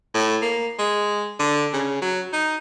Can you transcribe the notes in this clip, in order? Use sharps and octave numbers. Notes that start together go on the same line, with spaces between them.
A2
A#3
G#3
D3
C#3
F#3
D#4